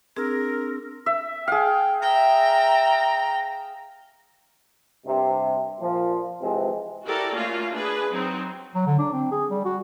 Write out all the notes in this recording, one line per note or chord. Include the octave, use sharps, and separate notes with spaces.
C4 D4 G#4 A#4 E6
E5
G#4 F5 G5
E5 G5 A#5
G2 C3
A#2 F3
C3 E3 F3 G#3 C4
E4 F#4 G4 A4 A#4 D5
A3 A#3 C#4 F4 F#4
D4 G#4 B4
F#3 C4 D#4
F#3
D3
D4
C4
G#4
G3
F#4